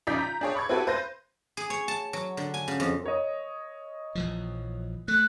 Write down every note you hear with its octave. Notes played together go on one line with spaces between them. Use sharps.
A#1 C#3 D#4 D5 G6 B6
A#5
D4 G#4 C#5
B5 C#6 G#6
C4 E4 F#4 G4 A4 B4
B4 C5 G6 A#6
G#4
C#5
A5
F#3
D3
G#5
C#3
F2
A#4 C#5 D#5
A#1 E3 F3
A3 F#6